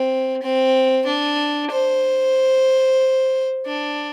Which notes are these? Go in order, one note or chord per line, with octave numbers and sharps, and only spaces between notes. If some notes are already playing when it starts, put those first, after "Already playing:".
Already playing: C4
C4
D4
C5
D4